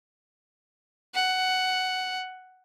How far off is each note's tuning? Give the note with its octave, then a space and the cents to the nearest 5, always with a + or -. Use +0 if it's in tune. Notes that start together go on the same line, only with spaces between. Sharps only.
F#5 +10